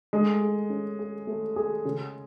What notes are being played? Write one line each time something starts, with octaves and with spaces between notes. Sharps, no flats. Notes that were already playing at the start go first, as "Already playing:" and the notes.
G#3 A3
G#4
C#4
G#4
A3
G#4
C#3